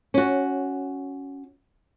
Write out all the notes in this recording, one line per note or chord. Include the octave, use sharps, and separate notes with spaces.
C#4 F#4